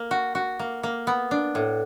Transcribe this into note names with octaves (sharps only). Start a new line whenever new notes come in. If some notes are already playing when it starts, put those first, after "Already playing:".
Already playing: A#3
F#4
F#4
A#3
A#3
B3
D4
A2